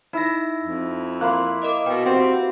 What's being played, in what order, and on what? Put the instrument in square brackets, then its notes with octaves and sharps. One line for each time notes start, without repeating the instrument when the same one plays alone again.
[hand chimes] D#4 E6 A#6 [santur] E4
[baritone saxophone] F2
[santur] A#3 E4 [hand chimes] C6 F#6
[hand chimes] A#4 D#5 D6
[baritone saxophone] B2 [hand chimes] B4 G5
[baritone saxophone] C4 [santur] F#4 G4